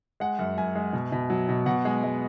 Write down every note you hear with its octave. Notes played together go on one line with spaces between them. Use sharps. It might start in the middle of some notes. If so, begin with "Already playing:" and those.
G#3 F#5
F#2
F#2 G#5
G#3
B2
B2
F#3
B2
B2 F#5
G#3
G#3